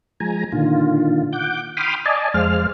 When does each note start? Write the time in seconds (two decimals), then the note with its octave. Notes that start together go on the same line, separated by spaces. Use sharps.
0.20 F3 G#3 G#5 A#5
0.52 A#2 D3 D#3 F4
1.33 F#5 D6 G6
1.77 G5 B5 C6 D6 D#6 F6
2.06 D5 D#5 G#5 A5
2.34 F2 G#3 C5 F5 F6